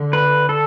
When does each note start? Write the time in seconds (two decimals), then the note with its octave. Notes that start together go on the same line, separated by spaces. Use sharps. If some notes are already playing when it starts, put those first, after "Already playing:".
Already playing: D3
0.13 B4
0.49 A4